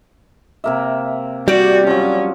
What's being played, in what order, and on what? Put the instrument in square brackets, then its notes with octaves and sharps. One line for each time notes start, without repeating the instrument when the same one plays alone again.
[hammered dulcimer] C3 A#3 E5
[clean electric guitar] G3 [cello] F#4 [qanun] G4 D5
[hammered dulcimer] F3 F#3 [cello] C#4